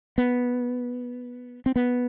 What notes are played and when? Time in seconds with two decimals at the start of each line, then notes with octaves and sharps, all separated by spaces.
0.18 B3
1.66 C4
1.76 B3